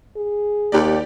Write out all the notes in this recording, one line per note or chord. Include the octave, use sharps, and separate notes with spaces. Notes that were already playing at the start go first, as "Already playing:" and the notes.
G#4
D#2 G4 D5